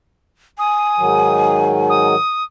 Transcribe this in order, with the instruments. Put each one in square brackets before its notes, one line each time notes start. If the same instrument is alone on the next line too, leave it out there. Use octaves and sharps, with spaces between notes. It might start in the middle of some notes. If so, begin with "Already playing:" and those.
[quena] G#5 [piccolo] D#6
[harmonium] G#2 D#3 F#3
[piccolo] D#6